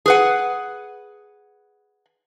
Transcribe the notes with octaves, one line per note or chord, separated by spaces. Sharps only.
G#4 B4 F#5